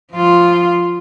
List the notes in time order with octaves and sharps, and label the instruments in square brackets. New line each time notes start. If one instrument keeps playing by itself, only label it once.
[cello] F3 F4